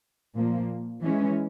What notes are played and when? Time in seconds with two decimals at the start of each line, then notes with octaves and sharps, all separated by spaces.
0.35 A#2 F3 A#3
1.02 E3 G#3 C#4